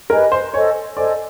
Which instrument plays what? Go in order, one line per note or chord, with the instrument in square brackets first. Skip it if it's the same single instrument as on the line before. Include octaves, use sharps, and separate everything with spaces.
[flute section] G4 B4 D#5 G#5 [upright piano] A#4
[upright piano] C5
[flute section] A4 C5 D#5 G#5 [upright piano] C#5
[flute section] A4 C5 D#5 G#5 [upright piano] D5